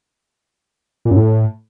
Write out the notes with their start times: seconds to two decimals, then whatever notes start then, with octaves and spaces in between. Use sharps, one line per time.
1.05 A#2
1.11 F#2
1.16 A2